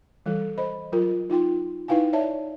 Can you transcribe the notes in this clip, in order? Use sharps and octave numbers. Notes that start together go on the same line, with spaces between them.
E3 G3 A4
C5 D#5 B5
F#3 F4 A#4
D#4 F4 G5 C6
D#4 E4 B4 F5 G5 G#5
C#5 D5 E5 A5